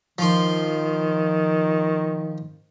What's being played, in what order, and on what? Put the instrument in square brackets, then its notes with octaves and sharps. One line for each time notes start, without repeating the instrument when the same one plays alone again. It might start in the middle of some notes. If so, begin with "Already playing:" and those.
[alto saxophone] D#3 [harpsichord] F3 C6